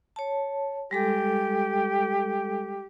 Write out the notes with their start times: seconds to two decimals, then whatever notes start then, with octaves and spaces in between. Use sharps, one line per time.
0.16 C#5 A5
0.91 G3 G#3 G4 A4